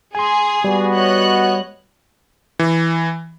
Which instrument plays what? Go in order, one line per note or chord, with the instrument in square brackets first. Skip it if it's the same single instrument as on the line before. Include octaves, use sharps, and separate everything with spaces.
[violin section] G#4 [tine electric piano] G#5 C6
[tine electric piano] G3 [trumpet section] B3 F#4
[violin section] C#5 D#5 F#6
[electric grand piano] E3